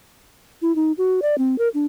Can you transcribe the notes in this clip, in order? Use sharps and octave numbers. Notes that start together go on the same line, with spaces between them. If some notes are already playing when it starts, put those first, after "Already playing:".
E4
D#4
F#4
D5
C4
A#4
D4